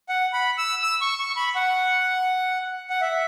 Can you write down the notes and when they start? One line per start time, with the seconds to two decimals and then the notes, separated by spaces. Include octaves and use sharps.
0.09 F#5
0.33 B5
0.58 E6
0.82 E6
1.01 C#6
1.19 C#6
1.36 B5
1.55 F#5
2.90 F#5
3.01 E5